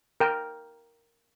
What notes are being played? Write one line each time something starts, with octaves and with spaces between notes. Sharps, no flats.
A#4 G5